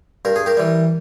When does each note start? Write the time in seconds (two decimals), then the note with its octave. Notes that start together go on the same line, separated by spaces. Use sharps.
0.25 G2 A#4
0.36 G#4
0.46 G4 A#4
0.57 E3 G3